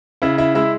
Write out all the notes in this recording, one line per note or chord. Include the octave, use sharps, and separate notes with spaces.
C#3 E4 E5
E4 E5
G#3 E4 E5